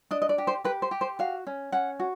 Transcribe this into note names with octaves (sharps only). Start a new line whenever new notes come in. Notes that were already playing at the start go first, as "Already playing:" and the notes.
D4 D#5
D#5
D5
G4
C5
G4 B4
C5
G4
C5
F#4 F5
C#4
C#4 F#5
F#4